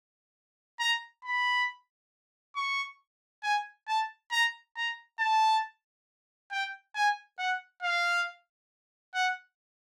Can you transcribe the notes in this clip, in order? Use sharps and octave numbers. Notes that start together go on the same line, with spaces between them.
A#5
B5
C#6
G#5
A5
A#5
A#5
A5
G5
G#5
F#5
F5
F#5